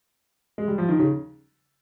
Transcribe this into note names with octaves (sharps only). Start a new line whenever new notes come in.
G#3
G3
F3
D#3
C#3